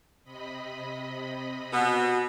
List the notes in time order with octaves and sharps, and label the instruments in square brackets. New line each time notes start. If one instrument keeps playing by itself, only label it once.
[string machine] C3 D#5 B5
[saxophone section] B2 B3